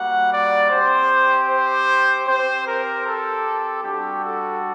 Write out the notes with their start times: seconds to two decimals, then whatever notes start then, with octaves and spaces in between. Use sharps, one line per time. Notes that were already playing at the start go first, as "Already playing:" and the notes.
Already playing: G3 A#3 F#4 F#5
0.31 D5
0.70 C4 G4 C5
1.48 C5
2.27 C4 G4 C5
2.66 A#4
3.05 A4
3.83 G3 D4 F#4 G4
4.22 A4